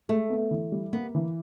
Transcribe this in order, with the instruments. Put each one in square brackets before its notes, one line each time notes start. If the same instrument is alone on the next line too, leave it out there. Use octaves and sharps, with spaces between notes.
[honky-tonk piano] G#3 [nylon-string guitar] A3
[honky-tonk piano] B3
E3
G3
[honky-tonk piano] A#3 [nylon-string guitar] B3
[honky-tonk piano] E3